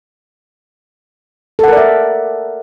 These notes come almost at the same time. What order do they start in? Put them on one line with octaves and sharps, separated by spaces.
A4 F#5 A#4 D5 E5